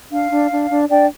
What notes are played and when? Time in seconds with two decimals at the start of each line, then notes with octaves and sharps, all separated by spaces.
0.11 D4 F5
0.31 D4
0.51 D4
0.71 D4
0.90 D4 D5 G5